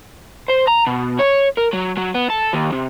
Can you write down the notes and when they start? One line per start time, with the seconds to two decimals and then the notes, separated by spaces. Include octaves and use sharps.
0.49 C5
0.68 A#5
0.87 B2
1.19 C#5
1.57 A#4
1.73 F#3
1.97 F#3
2.14 B3
2.30 A4
2.53 D#2
2.73 C3